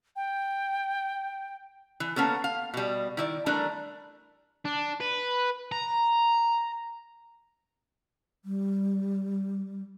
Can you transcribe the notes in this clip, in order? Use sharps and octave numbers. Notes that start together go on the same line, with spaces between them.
G5
E3
A#3 B3 C#4 A4
F5
B2 G3
D#3 E4 D5
E3 G3 A3 D4 A#4
D4
B4
A#5
G3